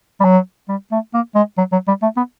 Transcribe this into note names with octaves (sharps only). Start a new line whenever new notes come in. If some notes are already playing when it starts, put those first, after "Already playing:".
G3
F#3
G3
A3
A#3
G#3
F#3
F#3
G3
A3
B3